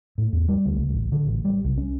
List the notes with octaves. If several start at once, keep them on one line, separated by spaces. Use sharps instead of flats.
A2
E2
G3
D2
C#2
A1
D3
A1
G3
C2
C#4